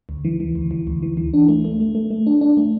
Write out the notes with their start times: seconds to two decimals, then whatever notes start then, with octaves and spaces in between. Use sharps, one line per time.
0.09 D2
0.25 E3
0.40 E3
0.55 D2
0.71 E3
0.87 D2
1.02 E3
1.17 E3
1.34 D4
1.48 A3
1.65 A3
1.80 A3
1.95 A3
2.10 A3
2.27 D4
2.41 D4
2.57 A3